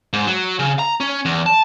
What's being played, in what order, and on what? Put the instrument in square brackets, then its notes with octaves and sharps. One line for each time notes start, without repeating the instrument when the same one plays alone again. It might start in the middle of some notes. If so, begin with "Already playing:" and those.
[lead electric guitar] G#2
F#3
C#3
A#5
C#4
E2
A5